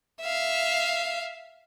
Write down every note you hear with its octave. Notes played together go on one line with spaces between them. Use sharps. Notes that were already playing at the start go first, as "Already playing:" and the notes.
E5 F5